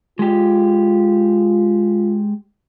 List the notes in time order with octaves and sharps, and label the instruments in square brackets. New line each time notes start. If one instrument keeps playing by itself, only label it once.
[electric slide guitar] G#3 G4 [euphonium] F4